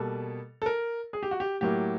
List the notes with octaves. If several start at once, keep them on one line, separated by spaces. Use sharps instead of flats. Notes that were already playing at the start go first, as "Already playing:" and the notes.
Already playing: B2 G3 A#3 A4
A4
A#4
G#4
G4
F#4
G4
A2 F#3 A#3 G4